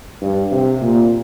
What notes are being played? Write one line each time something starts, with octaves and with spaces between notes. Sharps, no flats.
G2
C3
A#2